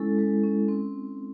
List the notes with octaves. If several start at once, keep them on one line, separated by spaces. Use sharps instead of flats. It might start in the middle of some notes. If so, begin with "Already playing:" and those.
Already playing: G#3 C#4 E4 A4
G#3
C#4
C4